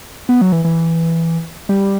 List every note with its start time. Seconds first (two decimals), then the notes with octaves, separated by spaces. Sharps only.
0.29 B3
0.41 F#3
0.52 E3
0.65 E3
1.69 G3